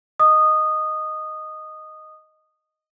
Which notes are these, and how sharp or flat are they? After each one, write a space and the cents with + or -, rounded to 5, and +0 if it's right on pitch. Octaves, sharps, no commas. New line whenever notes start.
D#5 +0 D#6 -15